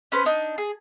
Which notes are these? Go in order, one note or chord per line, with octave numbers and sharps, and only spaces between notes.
C#4 B4 C5
D4 D#4
G#4